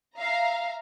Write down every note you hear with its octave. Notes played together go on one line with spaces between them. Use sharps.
E5 F5 A#5